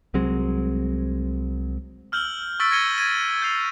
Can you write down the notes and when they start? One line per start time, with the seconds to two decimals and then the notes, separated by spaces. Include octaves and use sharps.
0.14 C2 F#3 G#3 C4
2.12 E6 F6 G6 F#7 G7
2.60 C#6 E6 A6 B6 D7 G7
2.71 G#6 A#6 C#7 D#7 G7
2.98 G#6 A#6 D#7
3.42 G6 G#6 C7 F7